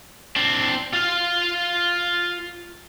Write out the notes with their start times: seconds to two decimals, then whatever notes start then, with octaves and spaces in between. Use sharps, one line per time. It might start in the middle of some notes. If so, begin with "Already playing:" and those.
0.36 C4 D4
0.93 F4 F5